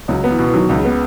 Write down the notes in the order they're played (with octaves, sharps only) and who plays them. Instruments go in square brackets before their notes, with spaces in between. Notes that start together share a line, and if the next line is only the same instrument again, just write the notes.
[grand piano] C#2 [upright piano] F#3
[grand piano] B3
[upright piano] E3
[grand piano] B2
[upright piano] E3
[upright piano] D#3 [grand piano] F#3
[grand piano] C#2
[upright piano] C#3
[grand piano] B3